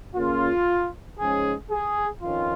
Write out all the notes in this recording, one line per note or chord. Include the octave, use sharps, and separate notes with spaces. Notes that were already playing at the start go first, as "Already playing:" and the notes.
C#3 A#3 C#4 F4
G#2 F3 G#3 C#4 G#4
G#4
F2 D#3 C#4 F4